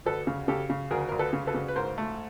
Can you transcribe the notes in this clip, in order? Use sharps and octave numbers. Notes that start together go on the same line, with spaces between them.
D2 A4 B4
C#3
C#3 G4 A4
C#3
D2 G#4 A#4
D2 A#4
A4 B4
C#3
A4 B4
C#3
B4
G#2 A#4 C5
A3